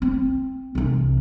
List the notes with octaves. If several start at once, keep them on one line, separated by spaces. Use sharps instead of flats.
C4
C2 E3